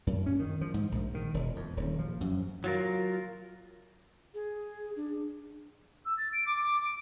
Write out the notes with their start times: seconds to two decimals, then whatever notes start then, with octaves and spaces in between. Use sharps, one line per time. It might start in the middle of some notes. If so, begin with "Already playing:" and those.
0.07 F#2
0.26 C#4
0.39 D#3
0.61 F3
0.74 G#2
0.92 A#1
1.15 D#3
1.34 E1
1.56 F2
1.77 D#1
1.99 F3
2.21 F#2
2.64 F#3 F4 A#4
4.34 G#4
4.96 D4
6.05 E6
6.17 A6
6.33 D7
6.46 D6
6.62 D6
6.84 D7